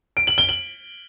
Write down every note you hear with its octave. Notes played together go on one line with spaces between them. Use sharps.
D7
F#7
G7
F#7